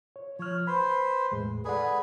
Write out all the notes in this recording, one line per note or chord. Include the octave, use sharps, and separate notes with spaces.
C#5
F3 C#5 F6
B4 C5 B5
E2 A2 G#3
G#4 A4 B4 D5 F#5